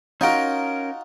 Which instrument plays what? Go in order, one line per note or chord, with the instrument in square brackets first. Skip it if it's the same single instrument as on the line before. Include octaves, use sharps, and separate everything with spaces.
[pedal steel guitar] C#4 A#4 [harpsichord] D#4 F4 F#4